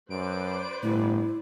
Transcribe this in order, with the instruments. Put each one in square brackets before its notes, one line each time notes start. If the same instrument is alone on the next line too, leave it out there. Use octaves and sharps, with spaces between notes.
[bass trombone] F#2 [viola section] B4 C5 D5 [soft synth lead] D7
[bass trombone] G1 [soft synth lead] A2 [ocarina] E4